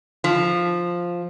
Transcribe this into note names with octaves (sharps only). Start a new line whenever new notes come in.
F3